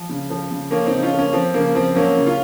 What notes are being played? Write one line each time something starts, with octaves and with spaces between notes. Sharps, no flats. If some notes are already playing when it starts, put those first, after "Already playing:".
Already playing: F3
C#3
F3
C#3
F3 A#3 C#4
C4 D#4
C#3
C#4 F4
F3
A#3 C#4
F3 C4
C#3 A#3
F3 C4
F#3 A#3 C#4
C#3
C#4 F4